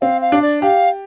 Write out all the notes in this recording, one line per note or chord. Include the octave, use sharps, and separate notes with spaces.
C4 F5
F5
D4
D5
G4 F5